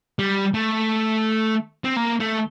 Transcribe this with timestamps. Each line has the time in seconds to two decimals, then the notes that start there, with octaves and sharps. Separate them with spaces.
0.19 G3
0.54 A3
1.84 C4
1.97 A#3
2.20 A3